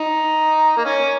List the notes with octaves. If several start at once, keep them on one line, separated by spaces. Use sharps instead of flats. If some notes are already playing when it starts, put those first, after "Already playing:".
Already playing: D#4
A#3
C#4